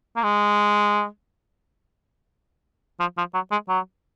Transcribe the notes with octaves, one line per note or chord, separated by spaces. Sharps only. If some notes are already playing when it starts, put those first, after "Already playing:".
A#3
G#3
F3
F3
F#3
G#3
F#3